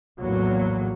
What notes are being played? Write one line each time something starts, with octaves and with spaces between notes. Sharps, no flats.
A#1 E2 A2 E3 F#3 A#3